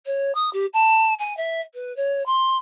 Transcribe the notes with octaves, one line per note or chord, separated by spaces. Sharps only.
C#5
D#6
G4
A5
G#5
E5
B4
C#5
C6